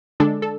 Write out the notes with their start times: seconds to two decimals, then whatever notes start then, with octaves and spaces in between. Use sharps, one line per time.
0.20 D3 G#3 D4 A4
0.42 A4